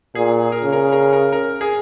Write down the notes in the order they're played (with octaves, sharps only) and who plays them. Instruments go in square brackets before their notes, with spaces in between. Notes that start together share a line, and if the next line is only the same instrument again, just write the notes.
[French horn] A#2 [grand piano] G#4
[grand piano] A#4
[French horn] C#3
[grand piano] A#4
A#4
A#4
A#4
G#4